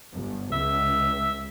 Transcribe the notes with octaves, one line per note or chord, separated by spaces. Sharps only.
G1
C#2 E5